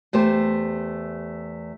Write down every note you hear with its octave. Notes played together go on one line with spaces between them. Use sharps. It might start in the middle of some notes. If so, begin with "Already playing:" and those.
E2 A3 G4 C5